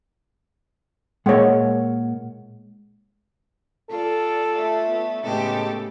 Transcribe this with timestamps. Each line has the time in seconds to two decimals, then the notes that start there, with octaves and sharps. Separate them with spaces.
1.26 A#2 G#3 A#4 C#5 F#5
3.89 F4 A4 D5
4.55 A3
4.89 B3
5.24 A2 C#3 G#3 B3 G4 A4